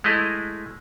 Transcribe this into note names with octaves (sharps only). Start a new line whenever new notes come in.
G#3 A3 E4 D#5